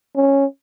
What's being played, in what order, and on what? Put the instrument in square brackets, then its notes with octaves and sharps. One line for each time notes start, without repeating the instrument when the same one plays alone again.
[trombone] C#4